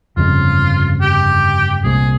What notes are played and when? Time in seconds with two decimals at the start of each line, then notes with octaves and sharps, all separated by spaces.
0.17 G1 F2 C#3 G#3 F4
1.01 G4
1.83 C2 A#2 G#3 C4 G#4